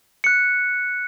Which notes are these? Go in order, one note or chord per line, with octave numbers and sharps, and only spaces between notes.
F#6 C#7